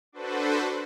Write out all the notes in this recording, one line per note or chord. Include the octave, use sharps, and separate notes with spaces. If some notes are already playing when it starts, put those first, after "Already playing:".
D4 F#4 A4 B4 C5